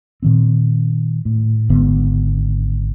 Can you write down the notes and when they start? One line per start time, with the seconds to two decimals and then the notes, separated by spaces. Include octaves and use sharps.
0.23 A#2 D#3 C4
1.25 A2
1.69 G#1 G#2 D3 B3